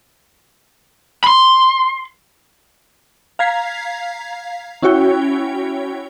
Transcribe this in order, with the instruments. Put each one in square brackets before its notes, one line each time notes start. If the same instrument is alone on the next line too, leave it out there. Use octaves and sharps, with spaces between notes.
[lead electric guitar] B5 C6
[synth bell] F5 A#5 G#6 B6 C7
C#4 E4 F#4 C#5 G5